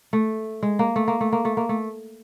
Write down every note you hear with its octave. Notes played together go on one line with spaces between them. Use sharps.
A3
G#3
A#3
A3
A#3
A3
A#3
A3
A#3
A3